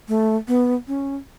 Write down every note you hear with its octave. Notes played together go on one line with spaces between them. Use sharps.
A3
B3
C#4